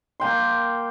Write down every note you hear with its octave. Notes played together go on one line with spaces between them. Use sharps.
A#3 G5 C6